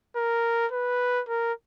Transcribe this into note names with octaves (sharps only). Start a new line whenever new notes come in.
A#4
B4
A#4